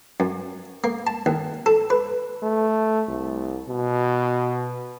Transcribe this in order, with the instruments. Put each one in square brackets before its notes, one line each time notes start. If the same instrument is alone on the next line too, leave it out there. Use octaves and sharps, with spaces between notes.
[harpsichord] F#2
A#3
A5
D#2
A4
B4
[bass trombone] A3
C2
B2